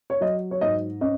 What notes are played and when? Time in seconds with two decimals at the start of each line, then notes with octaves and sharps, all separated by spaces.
0.10 C#5
0.21 F#3 D#5
0.51 C#5
0.61 G#2 D#5
1.01 C#4 D#5